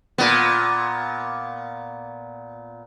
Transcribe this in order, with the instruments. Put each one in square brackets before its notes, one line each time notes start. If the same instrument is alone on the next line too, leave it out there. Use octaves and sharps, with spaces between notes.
[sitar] A#2 B3